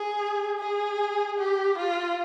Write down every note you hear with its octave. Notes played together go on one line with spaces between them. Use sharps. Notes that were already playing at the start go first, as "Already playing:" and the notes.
Already playing: G#4
G#4
G4
F4